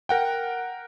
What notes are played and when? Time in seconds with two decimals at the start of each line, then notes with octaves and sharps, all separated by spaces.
0.09 A#4 F#5 G5